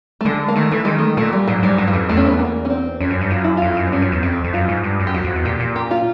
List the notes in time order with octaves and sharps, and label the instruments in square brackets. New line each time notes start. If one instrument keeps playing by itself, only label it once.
[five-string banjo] A3
[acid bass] D3 [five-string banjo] G#3
[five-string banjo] A#3
[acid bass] D#3 [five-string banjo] A3
[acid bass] E3 [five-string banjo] A3
[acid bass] D#3 [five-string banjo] G#3
[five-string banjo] A3
[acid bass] A#2 [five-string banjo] A3
[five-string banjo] G3
[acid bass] G#2 [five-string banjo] F#3
[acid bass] G#2 [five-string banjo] G3
[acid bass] G2 [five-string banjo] F#3
[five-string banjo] F3
[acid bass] F2 [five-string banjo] E3
[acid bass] E2 [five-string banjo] A3
[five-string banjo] C#4
C4
B3
A#3
C#4
C4
[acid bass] F2 [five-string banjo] C#4
[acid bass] F#2
G2
[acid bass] F#2 [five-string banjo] F4
[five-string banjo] E4
[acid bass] F2 [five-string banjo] F4
[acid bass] F#2
[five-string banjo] C4
[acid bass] G2 [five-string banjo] C#4
[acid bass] F#2
E2
[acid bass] F2 [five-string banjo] C4
[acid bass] F2
[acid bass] F#2 [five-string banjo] F4
[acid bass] G#2
G2
F#2
[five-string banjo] G4
[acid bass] F2 [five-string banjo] F#4
[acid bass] F2
E2
[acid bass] A#2 [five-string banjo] G4
[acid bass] A#2
[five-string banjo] G4
F4